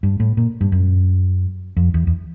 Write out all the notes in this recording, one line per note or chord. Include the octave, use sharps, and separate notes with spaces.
G2
A2
A#2
G2
F#2
F2
E2
E2